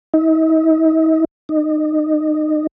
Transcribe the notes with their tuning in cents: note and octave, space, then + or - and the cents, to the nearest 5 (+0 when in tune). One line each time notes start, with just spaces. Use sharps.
D#4 +45
D#4 -25